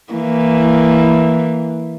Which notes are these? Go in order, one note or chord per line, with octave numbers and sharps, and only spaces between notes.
E3 A#3